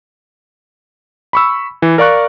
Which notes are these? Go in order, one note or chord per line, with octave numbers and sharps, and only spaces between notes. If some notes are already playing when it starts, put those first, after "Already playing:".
B5 C#6 E6
E3
A#4 D5 F5 C#6 F#6